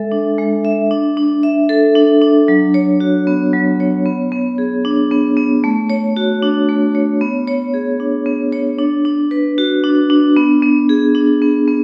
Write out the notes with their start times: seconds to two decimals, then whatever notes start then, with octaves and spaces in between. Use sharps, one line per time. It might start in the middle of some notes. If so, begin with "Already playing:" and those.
Already playing: G#3 A4 E5
0.12 D4
0.38 G#3
0.65 E5
0.91 D4
1.17 D4
1.43 E5
1.69 A4
1.96 D4
2.22 D4
2.48 F#3
2.74 C#5
3.00 F#4
3.27 B3
3.53 F#3
3.80 C#5
4.06 B3
4.32 B3
4.58 G#4
4.85 D4
5.11 B3
5.37 B3
5.64 A3
5.89 C#5
6.16 F#4
6.42 D4
6.69 A3
6.95 C#5
7.21 B3
7.47 C#5
7.74 G#4
8.00 D4
8.26 B3
8.53 C#5
8.79 D4
9.05 D4
9.31 B4
9.58 F#4
9.84 D4
10.10 D4
10.37 B3
10.62 B3
10.89 G#4
11.15 D4
11.42 B3
11.68 B3